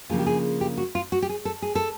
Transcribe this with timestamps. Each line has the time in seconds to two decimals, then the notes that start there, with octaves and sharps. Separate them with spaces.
0.10 C#3 F3 A#3 D4 F4 G#4
0.19 G4
0.26 G#4
0.61 G4
0.77 F#4
0.95 F4
1.12 F#4
1.22 G4
1.29 G#4
1.45 A4
1.62 G#4
1.75 A4